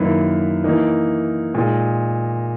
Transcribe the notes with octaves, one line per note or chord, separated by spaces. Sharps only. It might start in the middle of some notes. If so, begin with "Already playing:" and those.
Already playing: F#2 D#3 A#3 E4 B4
E3 A#3 D#4
A#2 G#3 D#4